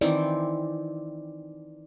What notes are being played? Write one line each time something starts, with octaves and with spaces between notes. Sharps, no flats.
D#3 E3 C4 D5